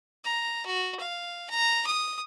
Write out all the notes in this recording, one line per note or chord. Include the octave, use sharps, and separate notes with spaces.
A#5
F#4
F5
A#5
D#6